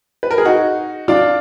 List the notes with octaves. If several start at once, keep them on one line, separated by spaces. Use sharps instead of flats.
B4
A#4
G#4
D#4 F#4
D4 F4